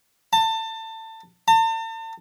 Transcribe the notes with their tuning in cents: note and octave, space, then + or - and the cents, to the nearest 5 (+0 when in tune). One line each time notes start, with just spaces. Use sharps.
A5 +25
A5 +40